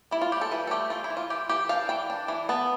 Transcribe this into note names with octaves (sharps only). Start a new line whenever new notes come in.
G3 E4
F4
G3 G4
A4
E3 B4
A4
A3 G4
E3 F4
E4
E3
F4
E3 G4
E3 G4
D4 F5
E3 G5
D4
E3
B3 A5